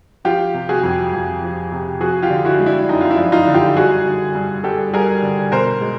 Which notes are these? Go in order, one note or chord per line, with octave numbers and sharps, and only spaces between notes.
F3 F4 G4
C3
F#4 G#4
F2
F2
F3
C3
F3 F#4 G#4
F4 G4
D3
E4 F#4
G#3
D4 E4
F#2 D#4
F4
D4 E4
F3
D#4 F4
D3
F4 G4
G3 F#4 G#4
D3
G2
G2 G4 A4
G3 G#4 A#4
D3
B2 A#4 C5
G#3